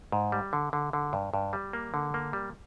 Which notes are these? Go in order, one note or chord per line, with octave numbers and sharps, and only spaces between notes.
G#2
G3
D3
D3
D3
G2
G2
G3
A#3
D3
A#3
G3